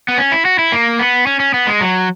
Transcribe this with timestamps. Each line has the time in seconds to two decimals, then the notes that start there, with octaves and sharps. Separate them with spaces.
0.08 B3
0.18 C#4
0.32 E4
0.45 F#4
0.59 E4
0.72 A#3
0.99 B3
1.27 C#4
1.40 C#4
1.54 B3
1.67 G#3
1.81 F#3